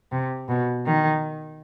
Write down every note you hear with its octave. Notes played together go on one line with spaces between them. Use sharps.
C3
B2
D#3